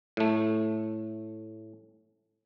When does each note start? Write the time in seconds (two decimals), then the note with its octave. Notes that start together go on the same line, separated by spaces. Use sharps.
0.17 A2 A3